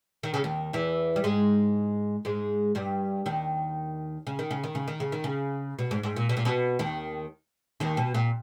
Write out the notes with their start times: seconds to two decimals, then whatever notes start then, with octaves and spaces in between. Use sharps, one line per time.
0.23 D#3
0.34 C#3
0.44 D#2 D#3
0.73 E2 E3
1.16 G3
1.24 G#2 G#3
2.25 G#2 G#3
2.75 G2 G3
3.26 D#2 D#3
4.27 C#3
4.39 D#3
4.51 C#3
4.64 D#3
4.75 C#3
4.88 D#3
5.00 C#3
5.12 D#3
5.24 C#3
5.79 B2
5.91 G#2
6.03 G#2
6.16 A#2
6.29 B2
6.37 A#2
6.45 B2
6.79 D#2 D#3
7.80 D#2 D#3
7.97 B2
8.14 A#2